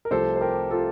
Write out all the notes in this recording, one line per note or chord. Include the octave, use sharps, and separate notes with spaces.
A#4
C2 C3 F3 A3 A4 C5
C5
G4 A#4
F4 A4